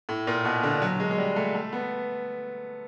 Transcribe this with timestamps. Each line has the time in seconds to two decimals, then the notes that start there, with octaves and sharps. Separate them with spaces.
0.09 A2
0.27 A#2
0.45 B2
0.63 D3
0.82 F#3
1.00 G#3
1.11 G#3
1.18 G3
1.36 A3
1.55 A3
1.73 B3